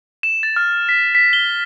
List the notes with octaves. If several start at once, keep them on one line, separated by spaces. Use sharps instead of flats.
E7
A6
F6
B6
B6
G7